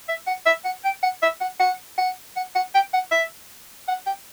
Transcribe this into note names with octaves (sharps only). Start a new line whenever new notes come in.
E5
F#5
E5
F#5
G5
F#5
E5
F#5
F#5
F#5
F#5
F#5
G5
F#5
E5
F#5
G5